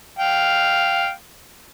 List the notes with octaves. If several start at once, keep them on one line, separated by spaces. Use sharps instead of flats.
F5 G5